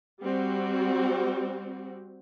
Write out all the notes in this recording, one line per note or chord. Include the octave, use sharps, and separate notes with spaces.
G3 C4 F#4